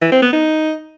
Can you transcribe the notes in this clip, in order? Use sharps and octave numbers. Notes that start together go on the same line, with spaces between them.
E3
C4
B3
D#4